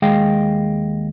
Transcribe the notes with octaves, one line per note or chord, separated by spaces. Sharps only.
D#2 G#3 G#4 D#5 F5 G5